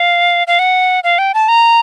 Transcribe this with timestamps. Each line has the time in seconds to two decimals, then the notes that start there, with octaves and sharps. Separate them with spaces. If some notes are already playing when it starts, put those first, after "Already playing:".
Already playing: F5
0.47 F5
0.59 F#5
1.04 F5
1.19 G5
1.34 A5
1.48 A#5